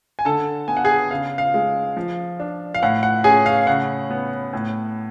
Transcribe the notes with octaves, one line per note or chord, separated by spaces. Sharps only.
G#5
D3 A4 A5
B3 G#5
F#5
G#4 G#5
C#3 F5
F5
G#3
F3
D4
F5
A2 F#5
F#5
C#4 G#4 G#5
F5
C#3 F#5
B3
A2